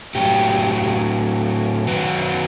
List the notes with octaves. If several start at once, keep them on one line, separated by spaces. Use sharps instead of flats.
A2 F#3 G4
F#2 D#3 F#3 B4